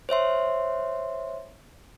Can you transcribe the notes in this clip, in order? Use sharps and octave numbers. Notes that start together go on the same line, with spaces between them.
C5 C#5 E5 C6